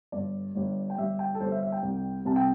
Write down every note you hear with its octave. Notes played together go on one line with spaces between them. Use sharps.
G1 G2 G3 D5
G1 G2 G3
G5
G1 G2 G3 E5
G5
A4
G1 G2 G3 C5
E5
E5
G5
C2 C3 G3
C2 C3 G3 A5
G5